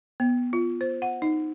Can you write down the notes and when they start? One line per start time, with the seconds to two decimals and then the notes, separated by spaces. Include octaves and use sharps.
0.20 B3
0.53 F4
0.81 C5
1.02 F#5
1.22 D#4